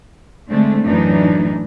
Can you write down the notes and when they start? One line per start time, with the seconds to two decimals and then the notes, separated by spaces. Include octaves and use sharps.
0.50 D3 G#3 A3 C4 D4
0.85 F#2 A2 E3 A3 D4 D#4